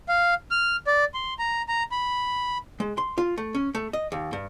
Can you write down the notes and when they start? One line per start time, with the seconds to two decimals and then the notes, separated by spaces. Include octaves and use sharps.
0.09 F5
0.51 F6
0.87 D5
1.14 C6
1.39 A#5
1.68 A#5
1.92 B5
2.80 G#3
2.98 C6
3.18 F4
3.38 A3
3.54 C#4
3.75 A3
3.93 D#5
4.12 D#2
4.33 G2